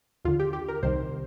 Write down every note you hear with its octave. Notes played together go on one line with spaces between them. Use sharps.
D#2 D3 F4
G4
G4
A#4
C2 C3 D#3 C5